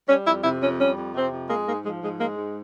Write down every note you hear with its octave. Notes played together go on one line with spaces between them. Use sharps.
G3 C#4
F2 E4
C3 E4
F2 C#4
G3 C#4
F2
C3 C4
F2
G#3 A#3
G#2 A#3
F3 G#3
G#2 G#3
G#3 A#3
G#2